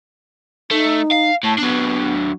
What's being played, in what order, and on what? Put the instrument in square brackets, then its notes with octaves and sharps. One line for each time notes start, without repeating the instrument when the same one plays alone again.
[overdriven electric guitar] A3 [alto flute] D#4
[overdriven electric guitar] F5
[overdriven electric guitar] A2 [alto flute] A5
[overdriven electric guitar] F#3 D4 [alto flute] B3